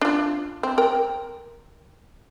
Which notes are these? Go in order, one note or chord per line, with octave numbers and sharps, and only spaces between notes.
D4 F4
C4
A#4 G5